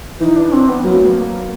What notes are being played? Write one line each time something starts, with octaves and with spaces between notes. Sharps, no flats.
E3 D#4
D4
C4
B3
F#3 A#3
A3
B3
A#3